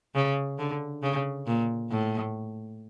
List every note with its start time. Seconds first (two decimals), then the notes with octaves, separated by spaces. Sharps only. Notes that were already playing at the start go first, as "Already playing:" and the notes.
0.15 C#3
0.59 D3
1.03 C#3
1.47 A#2
1.91 A2